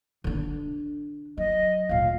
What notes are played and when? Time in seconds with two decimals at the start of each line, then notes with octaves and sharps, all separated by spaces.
0.24 D3 D4
1.38 F#3 D#5
1.89 D2 A#2 F5